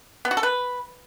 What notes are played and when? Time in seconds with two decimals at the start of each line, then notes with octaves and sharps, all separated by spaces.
0.25 B3
0.31 F#4
0.37 A4
0.43 B4